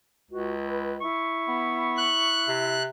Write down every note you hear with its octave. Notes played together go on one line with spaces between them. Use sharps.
C#2 F#4
B4
E4 C#6
B3
F#6
C3